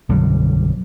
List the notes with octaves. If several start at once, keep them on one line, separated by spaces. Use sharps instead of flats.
B1 F#2 D3 G3